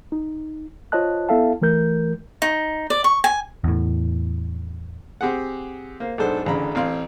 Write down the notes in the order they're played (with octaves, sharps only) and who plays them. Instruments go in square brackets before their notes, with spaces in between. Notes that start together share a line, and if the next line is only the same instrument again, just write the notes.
[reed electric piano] D#4
F4 C5 C#5 D#5 A5 F#6
B3 E4 A4 E5 F5 A5
E3 A3 A#4 G6
[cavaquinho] D#4
D5
C#6
G#5
[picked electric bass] E2 A2
[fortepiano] C4 G4 G#4 F#5
A#3 C5
B1 G#2 D4 A4 C5
A1 D2 C#3 A#5 B5
A1 C4 F5 C6